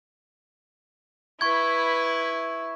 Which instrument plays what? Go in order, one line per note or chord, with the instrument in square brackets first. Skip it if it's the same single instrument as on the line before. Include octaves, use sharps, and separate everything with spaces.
[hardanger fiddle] E4 B4 [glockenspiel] C#6 G#6